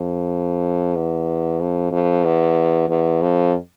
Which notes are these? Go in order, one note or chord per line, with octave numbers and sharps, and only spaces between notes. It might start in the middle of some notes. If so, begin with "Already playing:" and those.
Already playing: F2
E2
F2
F2
E2
E2
F2